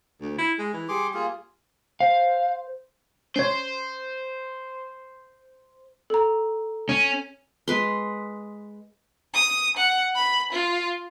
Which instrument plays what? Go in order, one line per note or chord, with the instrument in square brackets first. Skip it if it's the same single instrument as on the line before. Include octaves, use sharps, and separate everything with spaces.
[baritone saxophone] D2
E4
G#3
E3
[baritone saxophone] G3 [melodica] G#4 C6 D6
[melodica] A#3 F4 G#4
[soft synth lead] C5 [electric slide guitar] F5
[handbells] C#4 C#5 [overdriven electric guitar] C5
[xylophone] A4 A#5
[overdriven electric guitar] C#4
[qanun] G#3 B4 C6
[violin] D#6
F#5
B5
F4